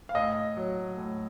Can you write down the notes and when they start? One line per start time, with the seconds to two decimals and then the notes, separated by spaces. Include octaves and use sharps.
0.09 F5
0.15 A2 D#5
0.57 F#3
0.97 A2